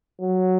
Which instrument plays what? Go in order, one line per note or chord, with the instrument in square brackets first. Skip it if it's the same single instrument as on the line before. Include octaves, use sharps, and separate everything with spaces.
[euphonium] F#3